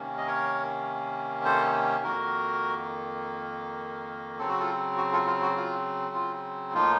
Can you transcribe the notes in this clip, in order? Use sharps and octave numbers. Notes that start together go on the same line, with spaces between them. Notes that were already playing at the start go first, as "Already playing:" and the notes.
Already playing: C3 D#3 A#3 C#4
D#5
A#4 C#5
A4 C5
F2 D#3 A#3 F#4 A#4
C#3 F#3 C4 A4
F#4
F4 A4
F#4
F4 A4
F4
F#4
F4
F4
A2 F3 A#3 D#4 F4